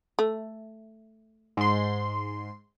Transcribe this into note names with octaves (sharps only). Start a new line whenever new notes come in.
A3
G#2 C6